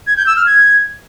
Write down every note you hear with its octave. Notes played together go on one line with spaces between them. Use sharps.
G#6
G6
E6
F6
G#6